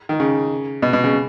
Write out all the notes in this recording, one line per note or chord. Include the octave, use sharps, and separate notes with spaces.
D#3
C#3
B2
B2
C#3